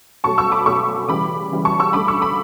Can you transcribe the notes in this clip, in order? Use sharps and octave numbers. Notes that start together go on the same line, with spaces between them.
B2 F#3 A3 A5 C#6
C#6 E6
B5 D6
B2 F#3 A3 C#6 E6
C#3 E3 G3 B5 D6
C#3 E3 G3
A5 C#6
C#6 E6
D3 A3 B5 D6
C#6 E6
B5 D6